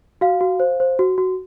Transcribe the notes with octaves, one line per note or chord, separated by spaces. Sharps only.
F#4 F5
F#4
C5
C5
F#4
F#4